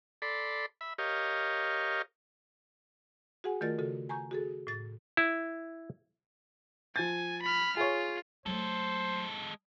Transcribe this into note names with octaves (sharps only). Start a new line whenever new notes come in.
A4 D5 B5 C6
E5 B5
G4 A#4 C#5 D#5 F5
F#4 G#4 F#5 G#5
D#3 A3 F4 A#4 D5 A6
C#3 F#4 A4
G#5 A#5 C#6 G6
F#4 G#4 A4
A2 A6
E4
F3 G#5 A6
B5 F6
F4 G#4 C#5
F#3 G#3 A3 A4 C5